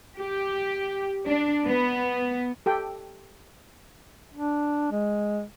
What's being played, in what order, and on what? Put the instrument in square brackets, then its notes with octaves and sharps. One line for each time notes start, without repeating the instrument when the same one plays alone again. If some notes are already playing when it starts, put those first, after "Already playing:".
[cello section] G4
D4
B3
[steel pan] G4 A4 G5
[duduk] D4
G#3